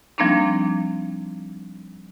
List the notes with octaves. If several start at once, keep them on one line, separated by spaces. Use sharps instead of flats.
F3 G3 A#3 C4 D4 D#4